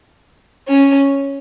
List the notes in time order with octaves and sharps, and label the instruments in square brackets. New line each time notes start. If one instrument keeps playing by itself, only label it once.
[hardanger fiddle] C#4